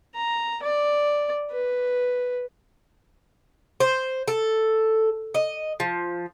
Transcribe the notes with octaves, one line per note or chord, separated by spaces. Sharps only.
A#5
D5
B4
C5
A4
D#5
F3